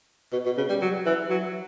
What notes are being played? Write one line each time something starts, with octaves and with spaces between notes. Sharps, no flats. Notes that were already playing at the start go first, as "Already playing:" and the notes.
B2
B2
C#3
G3
F#3
E3
F#3